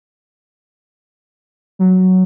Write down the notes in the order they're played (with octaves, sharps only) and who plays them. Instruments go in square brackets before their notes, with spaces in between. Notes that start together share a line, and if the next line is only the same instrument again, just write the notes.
[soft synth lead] F#3